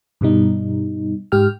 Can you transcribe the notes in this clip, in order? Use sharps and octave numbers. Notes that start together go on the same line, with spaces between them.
G2 B2 G3 D#4
G#2 G4 G5 F6